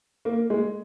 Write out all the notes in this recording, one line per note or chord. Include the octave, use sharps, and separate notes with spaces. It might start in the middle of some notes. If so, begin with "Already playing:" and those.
A#3
G#3